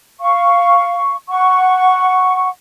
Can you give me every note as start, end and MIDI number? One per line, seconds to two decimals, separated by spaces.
0.20 1.14 77
0.20 1.14 85
1.29 2.49 78
1.29 2.49 85